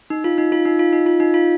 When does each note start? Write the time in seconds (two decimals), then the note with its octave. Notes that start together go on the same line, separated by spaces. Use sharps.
0.10 D#4
0.24 F4
0.38 D#4
0.52 F4
0.65 D#4
0.79 F4
0.93 D#4
1.06 F4
1.20 D#4
1.34 F4